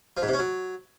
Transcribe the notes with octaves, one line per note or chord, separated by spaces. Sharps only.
F3
G#2
C3
C#4
F#3